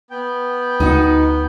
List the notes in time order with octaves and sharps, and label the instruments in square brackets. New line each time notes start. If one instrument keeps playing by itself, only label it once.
[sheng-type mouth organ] B3 G5
[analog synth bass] D2 [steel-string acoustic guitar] D#4 F#4